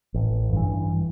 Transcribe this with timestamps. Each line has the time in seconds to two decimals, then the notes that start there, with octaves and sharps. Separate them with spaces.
0.14 A1
0.52 G2 E3